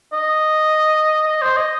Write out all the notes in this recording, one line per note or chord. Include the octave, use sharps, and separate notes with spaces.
D#5
D#5
C5
D#5